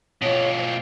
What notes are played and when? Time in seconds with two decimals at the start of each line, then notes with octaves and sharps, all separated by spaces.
0.22 B2 F4 C#5
0.59 C5